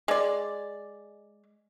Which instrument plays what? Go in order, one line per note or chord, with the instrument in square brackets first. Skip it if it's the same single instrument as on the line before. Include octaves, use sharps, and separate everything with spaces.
[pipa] G#3 D5